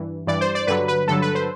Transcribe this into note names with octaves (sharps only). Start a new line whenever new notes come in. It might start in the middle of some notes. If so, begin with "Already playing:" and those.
Already playing: G2 E3
G2 E3 D5
C5
D5
G2 D3 F#3 B4
B4
G2 D3 F#3 A4
B4
C5